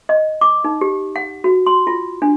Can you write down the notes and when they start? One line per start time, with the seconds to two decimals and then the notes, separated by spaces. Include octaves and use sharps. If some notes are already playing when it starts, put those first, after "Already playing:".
0.09 D#5
0.41 D6
0.64 D#4
0.81 G4
1.16 F#5
1.44 F#4
1.66 C6
1.87 F4
2.22 D4